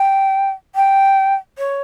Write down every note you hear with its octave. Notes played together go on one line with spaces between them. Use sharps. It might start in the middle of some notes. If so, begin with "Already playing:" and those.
Already playing: G5
G5
C#5